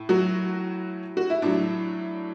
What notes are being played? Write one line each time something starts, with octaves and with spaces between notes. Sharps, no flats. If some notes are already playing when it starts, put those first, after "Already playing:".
Already playing: A2
F#3 F#4
F#4
E4
A2 F#3 D4